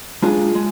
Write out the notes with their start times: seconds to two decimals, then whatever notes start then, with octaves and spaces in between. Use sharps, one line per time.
0.22 G#3 D4 F4 G#4
0.55 G#3